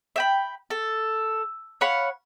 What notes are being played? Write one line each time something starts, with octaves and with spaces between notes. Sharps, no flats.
E5 G5 B5
A4
C#5 F5 F#5 B5